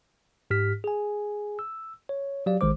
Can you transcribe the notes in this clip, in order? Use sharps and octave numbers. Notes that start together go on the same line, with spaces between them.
G#2 G4 F6 B6
G#4 G#5
E6
C#5
F#3 G4 D5 F5
A1 D#3 G#3 C5 D6